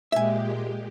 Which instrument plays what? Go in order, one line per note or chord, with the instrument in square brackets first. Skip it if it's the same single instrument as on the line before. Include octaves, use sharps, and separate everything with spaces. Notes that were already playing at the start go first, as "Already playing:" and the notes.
[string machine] A#2 G#3 G4 [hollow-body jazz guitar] E5 G#5